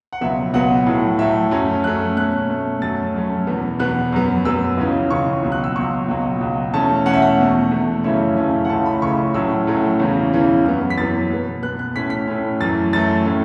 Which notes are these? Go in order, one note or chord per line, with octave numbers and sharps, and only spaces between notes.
F#5
C#2 B2 F#3 B3 E5
C#2 B2 F#3 B3 F#5
A2 F#3 A3
A2 F#3 A3 E5
F#2 F#3 A3 C#4
F#2 F#3 A3 C#4 F#6
B2 A3 C#4 F#6
B2 A3 C#4
F#2 F#3 A3 C#4 A6
F#2 F#3 A3 C#4
E2 B2 B3
E2 B2 B3 F#6
F#2 F#3 B3
F#2 F#3 B3 E6
C#2 C#3 E3 C#4
C#2 C#3 E3 C#4 C#6
C#2 B2 F#3
F#6
E6
C#2 B2 F#3 C#6
C#2 B2 F#3
C#2 B2 F#3
E2 B2 A3 C#4 A5
E2 B2 A3 C#4 F#5
E5
F#5
E2 B2 A3
E2 B2 A3
F#2 C#3 E3 A3 C#4 E5
F#2 C#3 E3 A3 C#4
F#5
C#2 C#3 E3 A3 C#4 A5
B5
C#2 C#3 E3 A3 C#4 C#6
A2 F#3 A3 C#4 E6
A2 F#3 A3 C#4
E2 C#3 E3 C#4
E2 C#3 E3 C#4
F#2 E3 B3
B6
F#2 E3 B3 A6
B2 B3
B2 B3 F#6
F#6
A2 A3 C#4 B6
B6
A2 A3 C#4
F#2 E3 A3 A6
F#2 E3 A3 A6
A2 A3 C#4